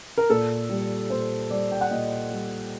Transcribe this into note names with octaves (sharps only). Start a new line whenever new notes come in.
A#4
A#2 A4
G3
A#2 C5
G3 D5
G5
F#5
A#2 D#5
G3